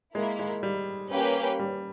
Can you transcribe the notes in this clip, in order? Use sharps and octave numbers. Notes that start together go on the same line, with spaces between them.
G#3 A#3 E4 A#4
G#3
G3
A#3 C#4 G4 B4 G5
G3